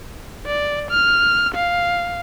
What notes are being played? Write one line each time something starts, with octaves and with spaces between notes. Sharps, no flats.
D5
F6
F5